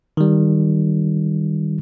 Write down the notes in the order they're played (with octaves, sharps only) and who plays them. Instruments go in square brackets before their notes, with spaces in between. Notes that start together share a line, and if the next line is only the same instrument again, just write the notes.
[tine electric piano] D#3 G3